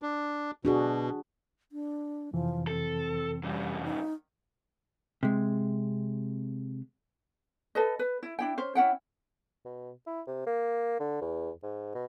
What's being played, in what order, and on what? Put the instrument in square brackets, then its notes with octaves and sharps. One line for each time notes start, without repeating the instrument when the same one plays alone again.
[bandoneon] D4
[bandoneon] B2 [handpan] D4 F#4 G#4
[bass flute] D4
[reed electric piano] F2 C3 E3 [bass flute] F3
[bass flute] C4 [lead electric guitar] A4
[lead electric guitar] G2 C#3 [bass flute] G3
[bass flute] D#4
[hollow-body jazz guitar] C3 G#3
[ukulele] A4 B4 D#5
B4
E4
D4 E4 G5
C#4 C5
C#4 E4 F#5 G5
[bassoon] B2
E4
C3
A#3
D3
E2
G#2
B2